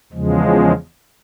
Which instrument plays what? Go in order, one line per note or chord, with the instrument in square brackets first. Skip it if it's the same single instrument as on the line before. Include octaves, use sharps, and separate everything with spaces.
[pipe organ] E2 C#3 F3 G#3